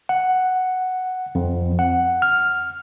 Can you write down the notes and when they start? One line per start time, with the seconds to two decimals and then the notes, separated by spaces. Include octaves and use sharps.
0.09 F#5
1.35 F2
1.79 F#5
2.22 F6